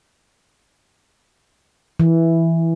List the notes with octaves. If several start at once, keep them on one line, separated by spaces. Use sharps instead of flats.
E3